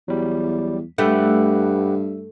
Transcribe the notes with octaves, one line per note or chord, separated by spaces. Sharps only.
E2 F#3 G3
G2 A3 G4 B4 F#5